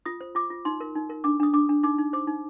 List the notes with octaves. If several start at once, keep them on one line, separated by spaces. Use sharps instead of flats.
F4 D#6
C5
F4 D6
F4
D#4 C6
A#4
D#4
A#4
D4 D6
D4 D#6
D4 D6
D4
D#4 D6
D#4
C5 D6
D#4